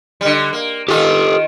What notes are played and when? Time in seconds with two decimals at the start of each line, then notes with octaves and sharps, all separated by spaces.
0.21 D3 G3
0.53 A#3
0.88 D#3 F4 G4 A4